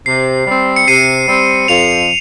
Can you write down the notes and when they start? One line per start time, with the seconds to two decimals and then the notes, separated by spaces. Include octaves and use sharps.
0.06 C3 C7
0.47 G3 C4
0.76 C#7
0.87 C3 C7 D#7
1.28 G3 C4
1.68 F2 C#7 F7